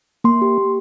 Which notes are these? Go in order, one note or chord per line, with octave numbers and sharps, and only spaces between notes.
A#3 C6
G4
A#3